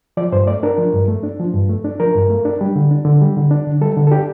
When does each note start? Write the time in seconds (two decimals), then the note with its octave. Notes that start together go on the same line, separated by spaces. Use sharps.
0.17 F3 D5
0.32 G2 C5
0.47 A3 D5
0.63 D4 A#4
0.78 F3
0.94 G2
1.08 A3
1.23 D4
1.39 F3
1.53 G2
1.69 A3
1.84 D4
2.00 F3 A#4
2.15 G2
2.30 A3
2.45 D4
2.61 G3
2.76 D3
2.91 D4
3.05 D3
3.22 G3
3.37 D3
3.51 D4
3.67 D3
3.81 G3 A4
3.97 D3
4.07 A4
4.12 D4 G4